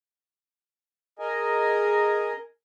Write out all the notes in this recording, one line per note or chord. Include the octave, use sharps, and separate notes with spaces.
G#4 A#4 D#5 G#5